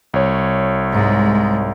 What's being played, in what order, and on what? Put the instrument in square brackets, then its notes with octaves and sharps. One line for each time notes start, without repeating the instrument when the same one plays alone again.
[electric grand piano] C2 C#5
[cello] G#2 G#3